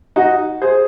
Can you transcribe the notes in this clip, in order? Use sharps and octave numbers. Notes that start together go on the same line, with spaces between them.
D#4 F#4
G#4 C5